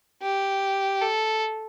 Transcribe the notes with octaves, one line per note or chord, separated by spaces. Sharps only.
G4
A4